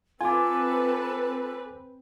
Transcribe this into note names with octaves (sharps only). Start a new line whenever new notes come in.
C4 F4 A4 B4 G#5 D6